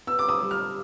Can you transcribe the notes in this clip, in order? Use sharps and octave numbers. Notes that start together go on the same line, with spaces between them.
B3 E6
D6
D#6
G3
F6